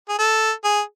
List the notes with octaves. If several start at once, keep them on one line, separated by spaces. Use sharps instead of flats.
G#4
A4
G#4